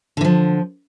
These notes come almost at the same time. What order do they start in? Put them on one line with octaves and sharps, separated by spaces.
D3 E3 F3